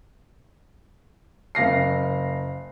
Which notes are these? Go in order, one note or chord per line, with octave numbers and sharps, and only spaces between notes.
F#1 F5 A#6 C7